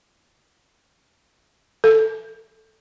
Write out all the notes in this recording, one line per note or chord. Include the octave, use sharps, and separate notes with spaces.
A4